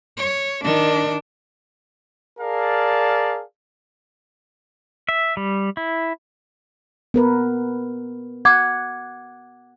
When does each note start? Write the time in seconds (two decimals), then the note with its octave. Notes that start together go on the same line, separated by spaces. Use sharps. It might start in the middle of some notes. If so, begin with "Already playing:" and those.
0.17 C#5
0.64 D#3 D4
2.40 G#4 A#4 D5 F5 A5
5.09 E5
5.37 G3
5.77 E4
7.14 B3 A#4 B4
8.45 F#5 D6 G#6